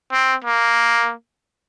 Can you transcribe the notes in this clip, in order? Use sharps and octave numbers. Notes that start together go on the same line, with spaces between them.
C4
A#3